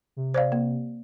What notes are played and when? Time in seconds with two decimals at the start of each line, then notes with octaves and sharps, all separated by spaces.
0.16 C3
0.34 C5 D5 F5
0.52 A#3